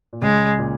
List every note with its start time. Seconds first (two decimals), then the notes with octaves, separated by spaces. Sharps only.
0.13 A#2
0.22 C#2 C#3 G#3
0.59 A#2